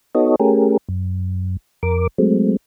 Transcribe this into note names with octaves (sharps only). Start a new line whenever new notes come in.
B3 D#4 F#4 A4 C#5 D#5
A3 C#4 G4 G#4 A#4
F#2
F2 A#4 D6
F#3 G#3 A3 C4